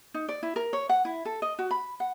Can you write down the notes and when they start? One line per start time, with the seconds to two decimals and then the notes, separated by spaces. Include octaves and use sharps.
0.14 D#4
0.29 D5
0.43 E4
0.56 A#4
0.73 C#5
0.89 F#5
1.05 E4
1.25 A4
1.42 D#5
1.59 F#4
1.71 B5
2.00 F#5